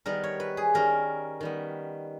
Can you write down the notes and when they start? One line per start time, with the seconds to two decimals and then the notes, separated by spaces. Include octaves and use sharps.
0.06 D#3 G3 B3 A#4
0.23 C#5
0.40 B4
0.57 G#4
0.74 D#3 G3 C#4 A#4
1.40 D#3 G3 B3